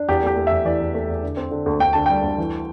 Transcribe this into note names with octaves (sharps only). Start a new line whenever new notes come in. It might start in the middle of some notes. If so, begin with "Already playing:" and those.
Already playing: D4
E2 G4
A3 G4
A3
E2 E5
E3 D5
E2
A3
E2
D3
C4
D3
D2
D2 G5
D3 A5
G3 G5
D2
E3